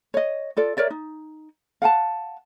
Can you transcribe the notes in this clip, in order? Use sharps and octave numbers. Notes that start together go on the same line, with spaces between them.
C#5 D#5
F4 A4 D5
A#4 C#5 D5 E5
D#4
F5 F#5 G#5 A5